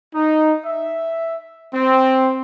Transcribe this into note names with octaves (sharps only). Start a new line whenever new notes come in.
D#4
E5
C4